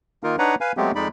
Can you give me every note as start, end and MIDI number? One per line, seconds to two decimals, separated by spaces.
0.24 0.36 51
0.24 0.36 58
0.24 0.36 63
0.24 0.36 65
0.24 0.36 70
0.39 0.55 62
0.39 0.55 63
0.39 0.55 71
0.39 0.55 73
0.39 0.55 78
0.39 0.55 82
0.61 0.72 71
0.61 0.72 77
0.61 0.72 80
0.77 0.92 54
0.77 0.92 56
0.77 0.92 57
0.77 0.92 59
0.77 0.92 60
0.77 0.92 67
0.95 1.08 41
0.95 1.08 56
0.95 1.08 63
0.95 1.08 74
0.95 1.08 83